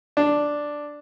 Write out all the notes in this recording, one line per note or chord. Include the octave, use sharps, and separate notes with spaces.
D4